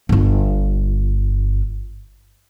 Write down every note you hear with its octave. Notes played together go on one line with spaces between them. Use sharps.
G1 F4